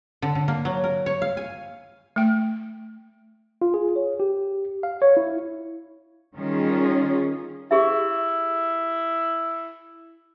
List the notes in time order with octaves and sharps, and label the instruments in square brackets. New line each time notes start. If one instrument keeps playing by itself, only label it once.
[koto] D3
D3
A#3
F#3
A#4
C#5
F5
G#5
[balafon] A3 G5
[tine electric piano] F4
G#4
C#5
G4
F5
C#5
E4
[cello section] D#3 G3 C#4 F4 G#4
[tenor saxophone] E4 [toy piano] G4 G#4 E5